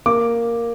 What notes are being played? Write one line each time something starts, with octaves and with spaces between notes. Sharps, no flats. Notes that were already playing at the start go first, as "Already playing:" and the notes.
A#3 D6